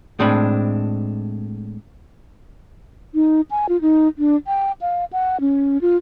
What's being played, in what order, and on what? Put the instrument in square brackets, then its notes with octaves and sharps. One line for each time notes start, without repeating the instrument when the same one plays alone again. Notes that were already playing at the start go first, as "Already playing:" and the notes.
[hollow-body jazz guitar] A2 G#3 C4 D4 B5
[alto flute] D#4
G#5
F4
D#4
D4
G5
F5
F#5
C#4
F4